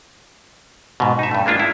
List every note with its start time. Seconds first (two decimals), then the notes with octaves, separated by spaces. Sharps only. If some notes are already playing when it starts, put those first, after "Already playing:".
1.00 G#2 B2
1.19 D#4 E5
1.31 G2 A3
1.46 G#3 A#3 D4 F4
1.59 E4